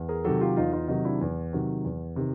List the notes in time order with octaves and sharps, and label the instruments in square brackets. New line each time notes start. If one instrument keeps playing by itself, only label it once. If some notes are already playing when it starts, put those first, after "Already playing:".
Already playing: [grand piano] E2
G#4 A#4
C3 D#3 F#3 G4 A4
F4 G4
E2 D#4 F4
D#4 F4
C3 D#3 F#3 D#4
D4 E4
E2
C3 D#3 F#3
E2
C3 D#3